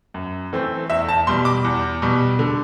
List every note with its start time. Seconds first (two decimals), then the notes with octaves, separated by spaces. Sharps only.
0.14 F#2
0.53 E3 A3 C4
0.89 E2 E5
1.09 A5
1.27 B2 G3 C6
1.45 D6
1.64 E2
2.02 B2 G3
2.39 D3